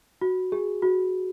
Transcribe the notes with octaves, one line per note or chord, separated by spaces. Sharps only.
F#4
G#4
F#4